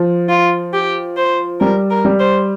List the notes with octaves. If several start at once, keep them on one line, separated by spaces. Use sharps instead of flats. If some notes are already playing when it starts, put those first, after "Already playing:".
Already playing: F3
F4
G4
C5
G3 A#4
A#4
G3
C5